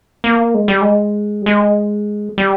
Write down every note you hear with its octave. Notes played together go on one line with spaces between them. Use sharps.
A#3
G#3
G3
G#3
G3
G#3
G3